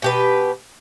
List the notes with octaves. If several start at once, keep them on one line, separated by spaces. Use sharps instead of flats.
B2 G4 B4